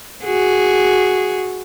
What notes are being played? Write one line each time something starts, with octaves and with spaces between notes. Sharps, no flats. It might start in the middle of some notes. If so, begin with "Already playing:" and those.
F#4 G#4